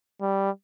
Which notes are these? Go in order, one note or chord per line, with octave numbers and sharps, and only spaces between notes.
G3